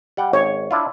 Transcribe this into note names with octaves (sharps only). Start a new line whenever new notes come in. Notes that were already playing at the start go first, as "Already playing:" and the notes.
G3 F#5 G5
G#1 C#5
D4 E4 F4